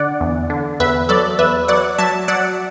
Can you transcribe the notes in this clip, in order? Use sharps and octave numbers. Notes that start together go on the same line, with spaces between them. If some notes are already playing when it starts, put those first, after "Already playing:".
Already playing: D3 D5 F#5
E2
D3
E2 B4 E5
F#3 A4 D5
E2 B4 E5
F#3 D5 F#5
F#3 E5 A5
F#3 D5 F#5